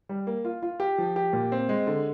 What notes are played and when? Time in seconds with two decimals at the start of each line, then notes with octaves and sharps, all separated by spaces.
0.09 G3
0.27 A#3
0.45 F4
0.63 F4
0.80 G4
0.98 F3
1.16 G4
1.33 A#2
1.52 C4
1.69 G#3
1.87 D3